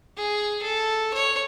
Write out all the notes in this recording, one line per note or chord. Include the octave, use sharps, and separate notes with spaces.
G#4
A4
C#5